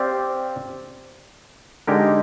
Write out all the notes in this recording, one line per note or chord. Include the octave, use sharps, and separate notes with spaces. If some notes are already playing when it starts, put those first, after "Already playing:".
Already playing: C4 G4 D5 F5
D3 G#3 D#4 G4 A#4